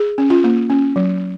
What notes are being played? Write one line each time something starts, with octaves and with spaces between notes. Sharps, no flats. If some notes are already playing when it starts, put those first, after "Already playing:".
Already playing: G#4
C#4
F4
A#3
C#4
F#3